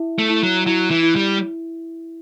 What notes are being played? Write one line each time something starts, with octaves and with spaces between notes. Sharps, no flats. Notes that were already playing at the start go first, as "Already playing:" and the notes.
Already playing: E4 E5
A3
E4
F#3
F#3 E4
E3
E4
G3